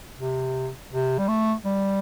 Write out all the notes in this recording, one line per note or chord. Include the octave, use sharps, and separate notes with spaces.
C3
C3
G3
A3
G3